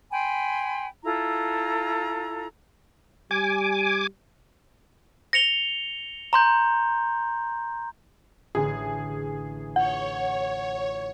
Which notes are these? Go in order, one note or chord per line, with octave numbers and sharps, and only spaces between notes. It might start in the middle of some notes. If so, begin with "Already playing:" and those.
G5 G#5 B5 C6
E4 F4 A4 A#5
G3 G#5 D6
A#6 C#7 F7 G7
A#5 C6 G6
A1 D3 G#4
F4 C#5 F#5